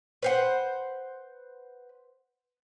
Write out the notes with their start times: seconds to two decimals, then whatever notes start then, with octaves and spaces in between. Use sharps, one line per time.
0.22 B4 C5 F#5